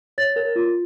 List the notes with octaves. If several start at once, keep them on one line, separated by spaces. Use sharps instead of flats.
C#5 A6
A#4
F4